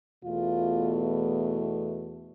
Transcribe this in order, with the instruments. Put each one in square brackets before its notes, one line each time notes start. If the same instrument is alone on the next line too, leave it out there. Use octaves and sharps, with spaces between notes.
[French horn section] E2 B2 A3 F4